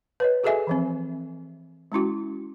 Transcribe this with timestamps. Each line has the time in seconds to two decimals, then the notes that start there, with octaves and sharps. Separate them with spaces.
0.20 B4 C#5 D#5
0.44 F#4 G#4 A4 D#5 E5 G#5
0.67 E3 F3 C4
1.92 G#3 C#4 E4 F#4